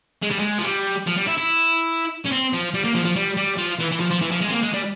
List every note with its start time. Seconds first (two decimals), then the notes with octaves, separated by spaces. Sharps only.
0.22 G#3
0.31 G3
0.39 G#3
0.58 F3
0.64 G3
1.06 F3
1.17 G3
1.27 E4
1.38 E4
2.26 C#4
2.32 C4
2.53 F3
2.74 G3
2.84 A#3
2.95 F3
3.05 F3
3.16 G3
3.37 G3
3.58 F3
3.79 E3
3.91 E3
4.00 F3
4.10 F3
4.21 E3
4.31 F3
4.41 G#3
4.48 C4
4.52 A#3
4.63 G#3
4.74 G3